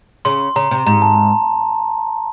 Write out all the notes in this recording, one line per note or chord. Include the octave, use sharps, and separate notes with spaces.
C#3 C6
C#3 A#5
C3
G#2 A#5
A5